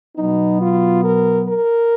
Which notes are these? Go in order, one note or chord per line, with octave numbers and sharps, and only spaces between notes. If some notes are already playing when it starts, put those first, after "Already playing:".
B2 F#3 B3 D#4
F4
A#4
A#4